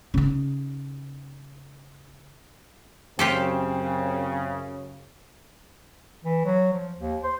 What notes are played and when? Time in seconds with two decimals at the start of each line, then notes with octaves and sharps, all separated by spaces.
0.14 C#3 D#4
3.19 F#2 C#3 C4 F4 G4 A4
6.24 E3
6.45 F#3
6.72 F3
6.98 D#2
7.23 C5